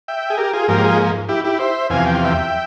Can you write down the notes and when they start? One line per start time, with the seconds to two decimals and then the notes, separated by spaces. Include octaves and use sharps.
0.08 E5 G5
0.30 G#4
0.37 G4 A#4
0.53 F4 G#4
0.68 G#2 F3 A#3 G4 A#4
0.84 F4 G#4
1.29 E4 G4
1.44 E4 G4
1.59 C5 E5
1.90 E2 C3 F3 F5 G#5
2.05 G5
2.15 F5
2.24 E5 G5